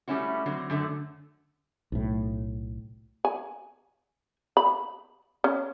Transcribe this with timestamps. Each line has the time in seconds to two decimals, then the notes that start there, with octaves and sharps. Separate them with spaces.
0.08 G3 A3 C#4 E4 F#4
0.46 D3 F#3 C4
0.70 F#2 D3 A3
1.92 B1 A2
3.25 G#5
4.57 B5
5.44 C#4